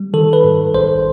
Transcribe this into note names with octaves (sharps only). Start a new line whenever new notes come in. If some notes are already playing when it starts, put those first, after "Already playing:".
Already playing: G3
D#3 A4
B4
G#2
A#1 C5